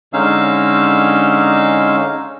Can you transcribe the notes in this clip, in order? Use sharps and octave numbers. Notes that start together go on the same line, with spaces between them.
D3 G#3 C#4 D#4 F5 E6